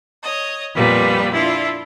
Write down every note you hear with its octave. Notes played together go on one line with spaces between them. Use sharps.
C#5 D#5
F2 A#2 G3 B3 B4
D4 E4 F4